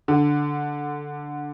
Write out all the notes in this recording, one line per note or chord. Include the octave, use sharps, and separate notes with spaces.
D3